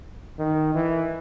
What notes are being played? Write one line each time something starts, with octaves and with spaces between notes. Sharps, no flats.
D#3
E3